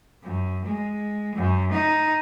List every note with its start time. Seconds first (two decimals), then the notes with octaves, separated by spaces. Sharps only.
0.23 F#2
0.65 G#3
1.35 F#2
1.72 D#4